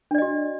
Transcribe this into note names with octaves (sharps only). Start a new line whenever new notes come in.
D4 F#4 D5 D#5